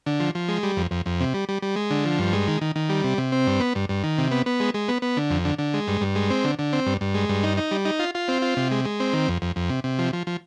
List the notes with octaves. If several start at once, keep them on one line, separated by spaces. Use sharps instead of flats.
D3
F3
F3
G#3
G3
F2
F2
F2
C3
G3
G3
G3
G#3
D3
F3
G2
G#3
D#3
D#3
D#3
G3
C3
C3
C4
G2
B3
G2
G2
D#3
C3
B3
B3
G#3
G#3
B3
B3
D3
F2
D3
D3
G#3
G2
G2
G#3
C4
D3
D3
C4
G2
G2
G#3
G2
D#4
D#4
G3
D#4
F4
F4
C4
F4
C3
G#3
G#3
C4
D#3
F2
F2
F2
C3
C3
F3
F3
F3